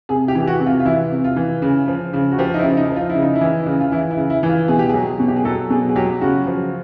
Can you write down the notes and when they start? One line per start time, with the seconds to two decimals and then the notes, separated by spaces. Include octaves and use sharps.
0.09 C3 G#4
0.28 G4
0.35 E3
0.41 G4
0.47 F#4
0.60 C3
0.66 F4
0.80 F4
0.85 E3 E4
1.12 C3
1.24 F4
1.36 E3
1.62 C#3
1.88 F3
2.13 C#3
2.32 F#4
2.38 F3 G4
2.54 D#4
2.58 E4
2.64 C#3
2.77 D#4
2.90 F3
2.96 F4
3.09 E4
3.15 C#3
3.22 D#4
3.35 E4
3.41 E3
3.66 C#3
3.80 F4
3.92 E3 E4
4.11 E4
4.17 C#3
4.30 E4
4.43 E3
4.49 F4
4.68 B2 G#4
4.79 G4
4.89 F#3 G#4
5.20 B2
5.28 G4
5.36 G#4
5.45 F#3 A4
5.70 B2 G#4
5.89 G#4
5.96 F#3 G4
6.21 C#3 F#4
6.47 F3